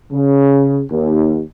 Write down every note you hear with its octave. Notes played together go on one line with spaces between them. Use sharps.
C#3
D#2